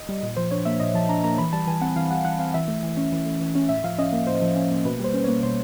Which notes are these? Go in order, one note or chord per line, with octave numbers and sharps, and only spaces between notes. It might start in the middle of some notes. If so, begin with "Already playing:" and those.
Already playing: D#5
G3
A#2
F3 C5
D4 C#5
A#3 E5
A#2 D#5
F3 A5
D4 A#5
A#3 A#5
E3 B5
G3 A5
E3 G#5
C4 F#5
E3 F5
G3 F#5
E3 F#5
C4 F5
E3 E5
A3
E3
C#4
E3
A3
E3
C#4
A2 E5
F3 F5
C#4 D#5
A#3
A2 C5
F3
C#4
A#3
B2 B4
G3 C5
C#4
A#3 C#5
B2 C5